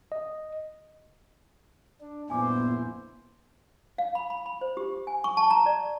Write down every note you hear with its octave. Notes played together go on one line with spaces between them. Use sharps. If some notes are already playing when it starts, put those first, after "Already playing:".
D#5
D4
G1 F2 A#2 B3 E4 C5 G#5 D6
F5
B5
B5
B5
C5
G4
G#5
C#6
A5
A#5
D5